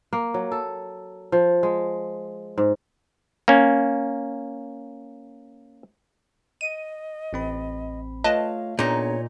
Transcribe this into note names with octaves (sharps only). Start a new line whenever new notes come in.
A#3
F#3
A4
F3
G#3
G#2
A#3 C#4
D#5 D#7
A1 C4 B5
A3 F4 B4 C#5 D#5 F5 A5
A#2 B3 D4 D#4 G#4 C#5